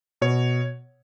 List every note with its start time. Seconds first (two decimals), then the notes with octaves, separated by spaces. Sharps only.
0.21 B2 C#5